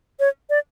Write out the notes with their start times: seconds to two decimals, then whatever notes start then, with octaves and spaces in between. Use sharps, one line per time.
0.20 C#5
0.50 D5